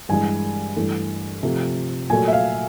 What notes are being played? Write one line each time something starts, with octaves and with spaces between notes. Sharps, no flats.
G2 E3 G#3 G#5
G2 E3 A3
C3 F3 A3
A#2 F#3 A3 G#5
E5
F5